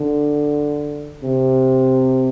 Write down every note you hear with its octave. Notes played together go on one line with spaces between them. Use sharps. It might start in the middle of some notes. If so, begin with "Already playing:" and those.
Already playing: D3
C3